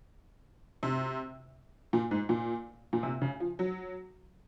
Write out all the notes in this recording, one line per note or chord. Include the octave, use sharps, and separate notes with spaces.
C3
A#2
G#2
A#2
A#2
C3
C#3
F3
F#3